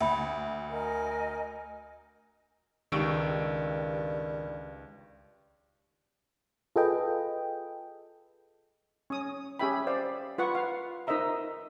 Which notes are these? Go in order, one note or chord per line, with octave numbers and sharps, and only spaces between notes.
D2 E5 B5
A#4 D#5 G#5
C#2 G2 D#3 D#4 G4 C#6 E6 D7
F4 G#4 A4 B4 D#5 G5
C#4 D#6
C#4 G4 G#4 E5 G5 B5
C5 D5 F5
F4 B4 F#5 C#6
F5
D#4 A#4 C5 D#5 E5 A#5